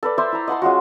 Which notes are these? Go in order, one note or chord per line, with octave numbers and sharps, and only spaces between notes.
A4 B4 D5
C5 D5 E5 C6
E4 A#5
D#5 F#5 A5 C6
G#3 C#4 F4 F#4